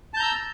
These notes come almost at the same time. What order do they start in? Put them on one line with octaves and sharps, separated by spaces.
A5 G6 A#5 E6